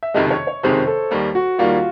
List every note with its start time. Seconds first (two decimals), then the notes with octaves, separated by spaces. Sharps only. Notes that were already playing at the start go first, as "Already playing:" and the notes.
0.03 E5
0.14 F#1 F2 C3 D#3 G#3 D#5
0.30 C#5
0.47 C#5
0.63 F#1 F2 C3 D#3 G#3 C5
0.87 A4
1.11 D#2 D#3 G3 A#3
1.35 F#4
1.59 D#2 D#3 G3 A#3 F4